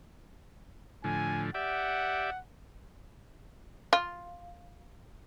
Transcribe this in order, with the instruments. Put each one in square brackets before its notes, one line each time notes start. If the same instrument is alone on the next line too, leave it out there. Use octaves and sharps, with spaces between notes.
[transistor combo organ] A2 D3 F3 [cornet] G#5
[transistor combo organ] G4 D5 E5 [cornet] F#5
[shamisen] F4